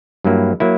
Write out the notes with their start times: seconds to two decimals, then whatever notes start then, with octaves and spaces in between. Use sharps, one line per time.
0.24 G2 F#3 A#3 E4
0.60 F#3 A#3 E4